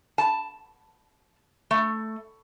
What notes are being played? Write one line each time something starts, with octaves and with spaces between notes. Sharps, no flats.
A5
A3